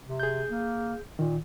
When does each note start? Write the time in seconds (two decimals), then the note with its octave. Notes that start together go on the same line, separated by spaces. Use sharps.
0.05 C3
0.20 G#4 G6
0.51 A#3
1.19 A#2 D#3